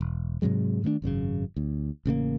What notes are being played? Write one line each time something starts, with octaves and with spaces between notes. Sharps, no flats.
E1
G#2 C3 F#3 G#3
D#3 A3 B3 D4
G#1 F#2 A2 C#3
D2
A1 C#3 G#3 A#3